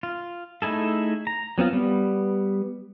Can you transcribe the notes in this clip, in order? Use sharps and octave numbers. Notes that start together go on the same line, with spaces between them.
F4
A3 D#4 E4 G#4 A4
A#5
F#3 B3 C4 F4
G3 B3